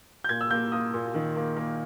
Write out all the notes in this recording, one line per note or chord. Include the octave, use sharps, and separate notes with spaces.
G6
A#2 G#6
E6
A#3 G6
A#3 D#6
A#2
D#3
A#3
A#3